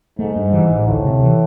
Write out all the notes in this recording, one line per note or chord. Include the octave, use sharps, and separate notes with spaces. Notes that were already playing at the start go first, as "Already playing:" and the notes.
G#2 A3
G2
E3
A1
D2 A2
C3
E3